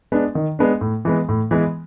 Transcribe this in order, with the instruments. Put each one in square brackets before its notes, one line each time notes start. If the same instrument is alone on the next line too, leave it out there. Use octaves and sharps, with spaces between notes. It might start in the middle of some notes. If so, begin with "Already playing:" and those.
[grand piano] G#3 B3 D4
D#3
G#3 B3 D4
A2
E3 G#3 B3
A2
E3 G#3 B3